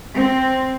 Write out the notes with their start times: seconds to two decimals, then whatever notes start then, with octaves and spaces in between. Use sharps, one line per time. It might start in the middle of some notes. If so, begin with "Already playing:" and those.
0.15 C4